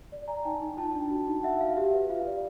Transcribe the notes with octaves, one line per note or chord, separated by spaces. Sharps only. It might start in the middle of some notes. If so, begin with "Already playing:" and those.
D5
D5 G#5 A#5
D#4 G5 A5
D#4
F4 G5 A5
D4
F#4
D#4
F#4 E5 F#5
F#4 F5
G4 E5
B4
F4 F5
D5